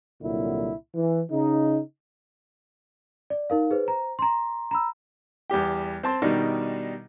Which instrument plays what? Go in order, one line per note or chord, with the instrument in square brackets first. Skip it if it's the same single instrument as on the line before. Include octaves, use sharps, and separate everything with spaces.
[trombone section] C2 A#2 D3 F#3 E4
E3
C#3 D#4
[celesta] D5
D#4 A#4 F5
G#4 B4 C5
C5 A#5
A#5 C6
A#5 B5 E6
[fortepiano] E2 G3 G4 G5
C4 A5 C6
B2 D#3 G3 D4 D#4